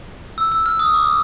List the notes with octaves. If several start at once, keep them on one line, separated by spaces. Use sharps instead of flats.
E6
E6
F6
D#6
D6